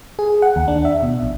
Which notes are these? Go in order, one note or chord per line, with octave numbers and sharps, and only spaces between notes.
G#4
F#5
D#2
D4
E5
B2
A#1